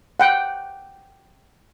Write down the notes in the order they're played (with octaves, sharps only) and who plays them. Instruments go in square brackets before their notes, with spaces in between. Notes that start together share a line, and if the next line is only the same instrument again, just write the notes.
[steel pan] F#5 G5